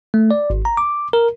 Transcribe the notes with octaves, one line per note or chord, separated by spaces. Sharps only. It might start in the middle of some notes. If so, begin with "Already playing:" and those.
A3
D5
G#1
A#5
D6
A#4